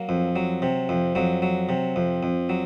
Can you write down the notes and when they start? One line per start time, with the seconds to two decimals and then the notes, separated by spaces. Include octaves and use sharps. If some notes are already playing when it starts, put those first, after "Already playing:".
Already playing: F#3 A#3
0.09 F2
0.36 F#3
0.62 C3
0.89 F2
1.15 F2 F#3
1.42 F#3
1.69 C3
1.96 F2
2.23 F2
2.49 F#3